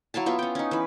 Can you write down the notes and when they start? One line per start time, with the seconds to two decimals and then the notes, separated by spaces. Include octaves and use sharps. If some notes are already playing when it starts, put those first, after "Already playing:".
0.14 F#3 E4 F5 A5
0.26 B3 F4 E5
0.39 C#4 G5
0.55 C#4 D#4
0.71 E3 B4